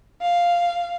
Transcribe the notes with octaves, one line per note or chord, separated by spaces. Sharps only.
F5